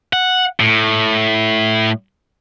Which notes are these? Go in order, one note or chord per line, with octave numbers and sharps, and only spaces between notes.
F#5
A2